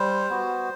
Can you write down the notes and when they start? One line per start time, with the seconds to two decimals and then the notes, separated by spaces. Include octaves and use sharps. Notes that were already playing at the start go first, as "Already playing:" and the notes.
Already playing: G3 C5
0.30 B3 F#4